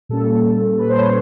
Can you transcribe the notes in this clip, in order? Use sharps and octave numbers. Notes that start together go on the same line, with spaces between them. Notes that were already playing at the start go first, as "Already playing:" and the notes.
A#2 G3 A#3 C#4 A4
B4
C5
C#5